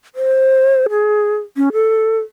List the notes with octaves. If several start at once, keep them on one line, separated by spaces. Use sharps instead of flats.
C5
G#4
C#4
A4